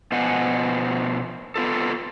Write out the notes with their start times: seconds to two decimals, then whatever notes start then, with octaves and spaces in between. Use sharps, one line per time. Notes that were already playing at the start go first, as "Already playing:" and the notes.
0.12 B2 F3 B3 C5 F#5 G#5
1.56 B3 F4 A4